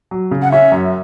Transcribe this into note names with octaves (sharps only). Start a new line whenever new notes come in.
F#3
C#3
F#5
C#4 E5
F#2